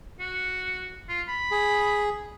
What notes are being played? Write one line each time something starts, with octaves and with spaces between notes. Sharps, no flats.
F#4
F4
B5
G#4